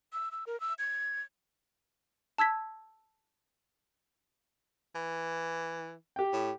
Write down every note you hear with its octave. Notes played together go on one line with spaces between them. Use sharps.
E6
E6
A#4
E6
G#6
A5 E6 G#6 B6
E3
G4 G5
A2